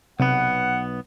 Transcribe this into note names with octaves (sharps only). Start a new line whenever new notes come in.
B1 C3 B3 F#5